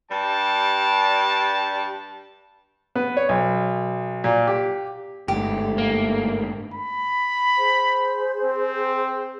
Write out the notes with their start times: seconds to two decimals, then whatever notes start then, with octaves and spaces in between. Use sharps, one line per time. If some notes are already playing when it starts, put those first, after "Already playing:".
0.11 G2 G3 A5
2.95 B3
3.17 C#5
3.29 B1
4.24 A#2
4.47 G4
5.28 G1 G#2 A3 G4
5.78 A#3
6.73 B5
7.57 G#4 C5
8.44 C4